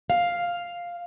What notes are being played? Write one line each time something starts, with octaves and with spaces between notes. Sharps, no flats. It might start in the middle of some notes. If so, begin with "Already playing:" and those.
F5